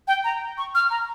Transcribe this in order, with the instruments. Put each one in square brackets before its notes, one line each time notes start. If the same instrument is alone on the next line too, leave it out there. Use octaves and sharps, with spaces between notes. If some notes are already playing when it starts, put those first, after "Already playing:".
[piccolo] G5
A#5
C#6
F6
A#5